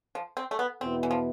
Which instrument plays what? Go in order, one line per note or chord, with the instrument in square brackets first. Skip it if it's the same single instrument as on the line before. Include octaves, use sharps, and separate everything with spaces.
[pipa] F3
C4
A3
B3
[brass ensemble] E2 B2 B3 E4 [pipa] C4
[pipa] E3
F3